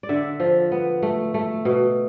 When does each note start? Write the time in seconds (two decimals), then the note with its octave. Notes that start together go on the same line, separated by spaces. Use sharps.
0.03 D5
0.09 D3 E5
0.40 F3
0.72 B3
1.02 A3
1.34 A3
1.65 B2